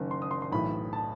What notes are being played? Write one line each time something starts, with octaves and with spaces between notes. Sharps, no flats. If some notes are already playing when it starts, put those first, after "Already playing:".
Already playing: F#1 F#2 D#3
C6
D#6
C6
C6
B1 A2 E3 B5
A5